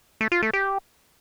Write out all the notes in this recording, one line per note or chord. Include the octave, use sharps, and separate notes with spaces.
A3
F4
A3
G4